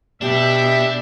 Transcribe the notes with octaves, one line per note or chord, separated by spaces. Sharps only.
B2 D4 G4 E5